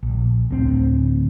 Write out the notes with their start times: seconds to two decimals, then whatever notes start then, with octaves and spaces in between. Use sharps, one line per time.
0.03 A#1
0.50 D1 D2 C4